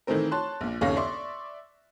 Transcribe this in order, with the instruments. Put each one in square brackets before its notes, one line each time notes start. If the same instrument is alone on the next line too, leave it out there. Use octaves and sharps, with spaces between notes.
[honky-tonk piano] D#3 E3 A3 C4 A#4
C#5 A5 C6 F#6
A#1 A#2
G1 D#2 C#3 C#4 F5 A#6
D5 E5 C6 C#6